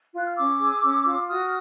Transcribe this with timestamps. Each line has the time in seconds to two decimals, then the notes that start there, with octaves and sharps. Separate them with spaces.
0.14 F4 F#6
0.27 F6
0.37 C#4 D6 E6
0.60 G#4
0.82 C#4
1.05 F4
1.28 F#4 D#6 F6